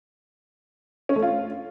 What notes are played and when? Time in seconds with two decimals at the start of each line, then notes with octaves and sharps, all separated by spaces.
1.09 C#4
1.16 A3
1.22 F4